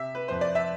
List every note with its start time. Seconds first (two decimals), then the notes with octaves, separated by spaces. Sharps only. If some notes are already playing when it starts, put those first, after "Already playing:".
Already playing: C3 E5
0.15 B4
0.28 F2 C5
0.41 D5
0.55 E5